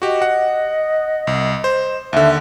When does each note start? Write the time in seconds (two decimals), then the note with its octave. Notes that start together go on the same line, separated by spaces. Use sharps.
0.02 F#4 G4 D#5
0.22 F#5
1.27 C2
1.64 C5
2.13 D#2 D3 E5